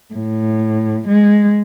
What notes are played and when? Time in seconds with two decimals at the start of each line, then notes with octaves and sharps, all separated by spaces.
0.13 A2
1.07 G#3